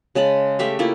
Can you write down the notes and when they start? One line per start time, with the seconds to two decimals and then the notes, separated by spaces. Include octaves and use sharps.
0.15 C#3 G#3 A5 B5
0.59 A3 G4 E5 F5
0.79 A3 A#3 E4 F4